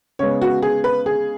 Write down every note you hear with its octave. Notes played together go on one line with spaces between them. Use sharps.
C#3 G#3 B3 C#5
F#4
G#4
B4
G#4